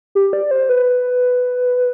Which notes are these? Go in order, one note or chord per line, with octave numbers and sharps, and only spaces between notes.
G4
D5
C5
B4